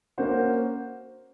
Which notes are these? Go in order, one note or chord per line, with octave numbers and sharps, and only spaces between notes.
A#3 C#4 F#4 C5